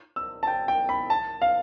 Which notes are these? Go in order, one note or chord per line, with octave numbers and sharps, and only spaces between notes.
E6
A5
G5
G5
B5
A5
F5